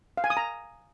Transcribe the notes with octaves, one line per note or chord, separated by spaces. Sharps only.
F5
G#5
D#6
A#5